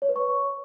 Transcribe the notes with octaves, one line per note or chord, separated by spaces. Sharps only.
C#5
B4
C#6